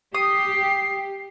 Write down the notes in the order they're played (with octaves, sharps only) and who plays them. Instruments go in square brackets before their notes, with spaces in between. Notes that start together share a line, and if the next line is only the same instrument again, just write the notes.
[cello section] G4 [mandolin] D#6 [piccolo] C7